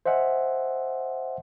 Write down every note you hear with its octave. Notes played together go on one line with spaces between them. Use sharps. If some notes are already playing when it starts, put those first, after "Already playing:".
C5 D#5 E5 F#5 G#5